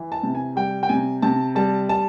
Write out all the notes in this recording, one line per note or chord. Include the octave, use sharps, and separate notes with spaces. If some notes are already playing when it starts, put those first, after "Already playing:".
Already playing: E3
A5
C3
G#5
G3 G5
G5
C3 G#5
C3 A5
G3 A5
A5